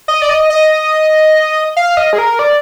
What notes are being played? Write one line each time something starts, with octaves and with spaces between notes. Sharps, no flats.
D#5
D5
D#5
D#5
F5
D#5
G#4
A#4
D5